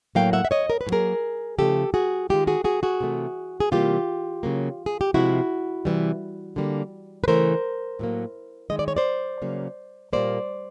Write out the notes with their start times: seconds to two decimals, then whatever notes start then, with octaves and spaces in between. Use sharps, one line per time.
0.15 A2 F#3 A#3 F5 G5
0.33 E5 F#5
0.45 E5
0.51 C#5 D#5
0.70 A#4
0.81 B4
0.87 A2
0.90 F#3 A#3 G#4 A#4
1.58 C#3 F3 A3 G4 A4
1.94 F#4 G#4
2.30 D#3 G#3 F4 G4
2.47 F#4 G#4
2.64 F#4 G#4
2.83 F#4 G#4
3.01 C3 E3 A3
3.60 G#4
3.72 C3 E3 G3 A#3 F4 G4
4.43 C#3 F#3 A#3
4.86 G#4
5.01 G4
5.14 C3 F3 G#3 E4 F#4
5.85 C3 E3 G3
6.56 D3 G3 A#3
7.24 B4
7.28 C#3 E3 A3 A#4 C5
7.99 A2 F#3 A#3
8.70 D#3 G#3 D#5
8.79 D5
8.88 C#5
8.97 C5 D5
9.42 C#3 F#3 A#3
10.13 A#2 G3 A#3 C5 D5